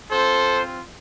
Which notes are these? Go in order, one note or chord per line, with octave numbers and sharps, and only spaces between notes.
C4 F4 A4 C5